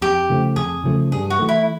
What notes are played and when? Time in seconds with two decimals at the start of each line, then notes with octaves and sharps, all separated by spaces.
0.01 F2 G4
0.29 C#3 F3 A3
0.56 F2 G#4
0.84 C#3 F3 A3
1.12 G2 G#4
1.30 F#4
1.39 E3 A3
1.49 E4